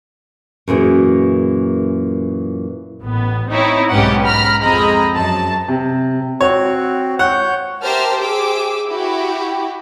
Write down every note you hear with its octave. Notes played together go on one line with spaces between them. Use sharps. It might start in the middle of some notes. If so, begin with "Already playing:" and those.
F#2 A#2 E3 G#4
A1 B3
C4 D#4 E4 C#5
B1 G#2 C#4 G4 B4 F#5
A#5 B5 F6
F2 G#3 C4 D#5 A#5 B5
F#2 A5
C3
C4 F#4 C#5
C#5 F#5 G6
G4 A#4 C5 E5 A5 F6
G4 G#4 D6 E6
E4 F#4 G4